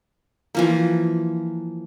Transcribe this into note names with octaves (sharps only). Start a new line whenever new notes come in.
E3 F3 A#3